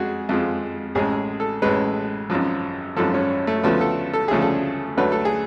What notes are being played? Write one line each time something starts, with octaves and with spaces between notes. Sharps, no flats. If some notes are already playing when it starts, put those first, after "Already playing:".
Already playing: F2 G#3 F#4 G#4
F2 F3 G#3
A1 A2 G#3 G#4
A4
A1 A2 G#3 B4
G#1 F#2 F3
G#1 F#2 F3 A4
C#4
A3
D2 C#3 F3 A3 B3
A4
A4
D2 C#3 F3 A3 G#4
A4
D2 D3 F#3 A3 B4
A4
G#4